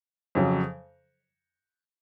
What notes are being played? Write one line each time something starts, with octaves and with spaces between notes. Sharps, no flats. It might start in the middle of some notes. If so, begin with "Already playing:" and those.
F2 C#3 F#3